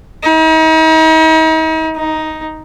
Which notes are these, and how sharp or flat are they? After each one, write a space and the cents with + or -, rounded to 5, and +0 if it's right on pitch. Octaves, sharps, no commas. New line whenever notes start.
D#4 +40
D#4 +5